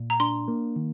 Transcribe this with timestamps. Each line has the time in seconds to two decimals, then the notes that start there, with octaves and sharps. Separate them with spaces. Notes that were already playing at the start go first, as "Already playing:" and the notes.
Already playing: A#2
0.10 A#5
0.20 D4 C6
0.48 A#3
0.76 D#3